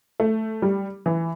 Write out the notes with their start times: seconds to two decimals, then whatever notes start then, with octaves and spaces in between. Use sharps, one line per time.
0.20 A3
0.62 G3
1.06 E3